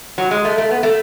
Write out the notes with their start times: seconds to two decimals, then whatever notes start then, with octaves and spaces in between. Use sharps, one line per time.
0.18 F#3
0.31 G#3
0.45 A3
0.58 A3
0.71 B3
0.83 A3